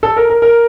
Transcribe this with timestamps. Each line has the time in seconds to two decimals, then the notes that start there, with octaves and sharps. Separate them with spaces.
0.03 A4
0.17 A#4
0.30 A#4
0.42 A#4